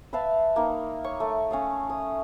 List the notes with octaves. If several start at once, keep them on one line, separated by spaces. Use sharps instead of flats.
B4 E5 F5 A5
A#3 D#4
C#5 C#6
A3
C#4 F5 D#6
D#6